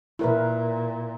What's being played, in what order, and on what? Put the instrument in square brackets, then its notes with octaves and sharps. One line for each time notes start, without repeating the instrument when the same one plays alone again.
[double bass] A#2 [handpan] E4 A#4 B4